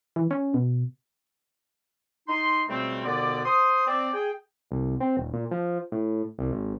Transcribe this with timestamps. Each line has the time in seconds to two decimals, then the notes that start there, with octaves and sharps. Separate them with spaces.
0.16 E3
0.31 C#4
0.54 B2
2.28 D#4 C6
2.69 C#2 B2 G3 A3 C4
3.05 D#2 B2 D3 B3 D5
3.45 C5 C6 D#6
3.87 C4 D5
4.13 G#4 G5
4.71 C2
5.00 C4
5.17 D#1
5.33 A#2
5.51 F3
5.92 A2
6.39 C2
6.51 G#1